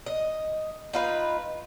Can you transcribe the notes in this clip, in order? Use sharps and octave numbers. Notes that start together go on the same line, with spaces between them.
D#5
D#4 F4 B4